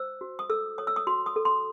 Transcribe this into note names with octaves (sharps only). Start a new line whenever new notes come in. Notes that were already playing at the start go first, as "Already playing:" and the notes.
Already playing: C5 E6
F#4
D#6
A4 E6
C#5 D#6
E6
D#6
F#4 C6
D#6
A4
C6